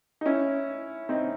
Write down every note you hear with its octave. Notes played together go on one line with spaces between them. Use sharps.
D#4
C#4 E4
C4 D#4